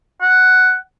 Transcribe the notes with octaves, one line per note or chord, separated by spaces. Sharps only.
F#5